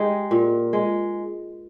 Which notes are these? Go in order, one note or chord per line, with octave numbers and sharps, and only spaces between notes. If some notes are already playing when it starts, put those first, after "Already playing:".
Already playing: G#3 D#4 G4
A#2
G#3